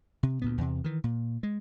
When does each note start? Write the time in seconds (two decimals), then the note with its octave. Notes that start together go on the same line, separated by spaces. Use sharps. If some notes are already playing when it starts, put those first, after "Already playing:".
0.23 C3
0.42 D2 A#2 B3
0.58 E2 C3
0.84 D#3 E3
1.04 A#2
1.43 G#3